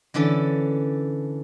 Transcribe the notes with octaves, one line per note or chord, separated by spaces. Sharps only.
D3 E3 C#4 D4 A4